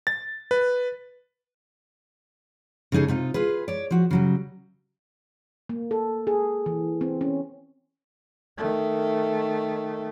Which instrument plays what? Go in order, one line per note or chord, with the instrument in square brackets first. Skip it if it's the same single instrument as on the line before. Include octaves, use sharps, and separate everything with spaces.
[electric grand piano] A6
B4
[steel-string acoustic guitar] C#3 G3 D#4 G#4 A4
C3 D#4 F4
F4 G#4 B4
C#5 D5
F3 F#4
C#3 F#3 G3
[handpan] A#3
A4
G#4
E3
C4
C#4
[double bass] D#3 A3